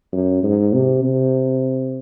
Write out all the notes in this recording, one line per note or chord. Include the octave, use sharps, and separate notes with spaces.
F#2
G#2
C3
C3